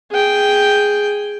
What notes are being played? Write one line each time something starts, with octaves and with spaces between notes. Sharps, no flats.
G#4 G5